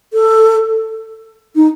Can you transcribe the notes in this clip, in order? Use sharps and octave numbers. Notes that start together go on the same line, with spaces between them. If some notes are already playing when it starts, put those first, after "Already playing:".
A4
D#4